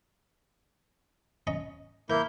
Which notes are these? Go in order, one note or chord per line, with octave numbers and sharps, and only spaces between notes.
C#4 D#5 A#5
A#3 E4 A#4 G6